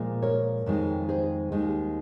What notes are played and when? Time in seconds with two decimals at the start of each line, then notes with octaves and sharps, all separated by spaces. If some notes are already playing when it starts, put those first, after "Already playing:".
Already playing: A#2 F3 G#3
0.22 A#4 C#5
0.66 F2 D#3 G#3
1.09 G#4 C5
1.52 D#2 D#3 G#3